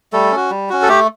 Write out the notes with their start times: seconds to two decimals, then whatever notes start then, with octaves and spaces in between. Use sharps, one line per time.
0.13 G3 A3 A4
0.31 C#4 F#4
0.51 G3
0.70 C#4 F#4
0.82 A4
0.88 A3 G4